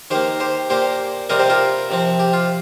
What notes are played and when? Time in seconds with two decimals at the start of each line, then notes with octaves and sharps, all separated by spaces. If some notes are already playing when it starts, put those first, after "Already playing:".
0.11 D#3 A#3 G4 C5
0.40 G4 C5
0.70 A#2 A#3 G4 C5
1.29 C3 G3 C4 A#4 D#5
1.39 G4 C5
1.50 F4 A#4
1.90 C3 F3 C4
2.19 G4
2.33 F4